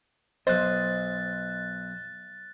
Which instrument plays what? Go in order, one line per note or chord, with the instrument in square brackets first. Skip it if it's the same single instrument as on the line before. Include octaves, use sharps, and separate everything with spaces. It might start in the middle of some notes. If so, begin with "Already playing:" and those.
[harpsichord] B1 [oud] C5 [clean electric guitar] D#5 [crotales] F#6 A6